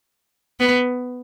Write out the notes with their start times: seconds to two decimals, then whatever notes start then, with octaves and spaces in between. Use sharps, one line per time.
0.60 B3